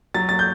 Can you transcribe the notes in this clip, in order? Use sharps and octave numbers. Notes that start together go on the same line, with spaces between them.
F#3 A6
F#3 A6
G6